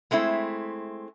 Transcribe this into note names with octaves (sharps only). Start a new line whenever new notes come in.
G#3 A3 C4 E4